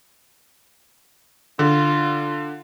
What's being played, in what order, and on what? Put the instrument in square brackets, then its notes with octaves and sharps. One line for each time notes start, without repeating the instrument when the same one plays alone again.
[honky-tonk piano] D3 [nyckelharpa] F4